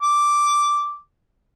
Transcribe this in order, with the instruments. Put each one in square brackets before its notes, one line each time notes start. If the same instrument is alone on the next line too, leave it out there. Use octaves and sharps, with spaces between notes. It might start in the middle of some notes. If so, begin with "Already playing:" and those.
[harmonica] D6